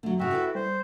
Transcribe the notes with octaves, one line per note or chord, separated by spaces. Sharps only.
D3 F#3 A3
G#2 C#3 F#4 E5 G5
E4 A4 B4
G3 C5